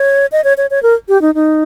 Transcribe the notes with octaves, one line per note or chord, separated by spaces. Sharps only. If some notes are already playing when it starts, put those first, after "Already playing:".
Already playing: C#5
D#5
C#5
C#5
C#5
A#4
G4
D#4
D#4